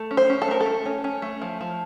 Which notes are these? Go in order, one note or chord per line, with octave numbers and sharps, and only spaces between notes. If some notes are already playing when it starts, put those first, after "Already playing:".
Already playing: A3
C#4
C5
C#4
A4
A3 A#4
A4
A3
C#4
C#4
A3
F3
F3